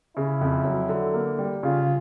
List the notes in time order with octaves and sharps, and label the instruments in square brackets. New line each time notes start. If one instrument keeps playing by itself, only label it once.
[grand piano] C#3 [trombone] E4
[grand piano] F2
F#3
D3
A#3
G3
[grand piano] C#3 [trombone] F4